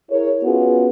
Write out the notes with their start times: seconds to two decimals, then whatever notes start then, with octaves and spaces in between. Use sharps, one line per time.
0.10 E4 G#4 A#4 C#5
0.44 B3 C#4 F4 F#4 G#4